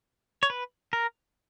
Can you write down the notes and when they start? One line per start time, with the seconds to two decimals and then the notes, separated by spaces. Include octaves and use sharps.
0.43 C#5
0.50 B4
0.93 A#4